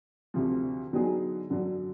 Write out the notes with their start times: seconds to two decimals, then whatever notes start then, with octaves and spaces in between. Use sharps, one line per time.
0.34 D2 C3 F3
0.93 D3 F#3 B3 D#4 G#4
1.50 F#2 D3 F#3